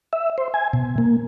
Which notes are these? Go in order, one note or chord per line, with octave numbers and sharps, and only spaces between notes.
E5
C5
G#5
B2
A#3